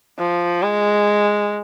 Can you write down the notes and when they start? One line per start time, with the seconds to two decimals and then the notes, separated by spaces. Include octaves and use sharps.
0.19 F3
0.63 G#3